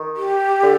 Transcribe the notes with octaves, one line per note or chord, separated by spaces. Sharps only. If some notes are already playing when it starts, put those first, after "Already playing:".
Already playing: D#3
G4
D3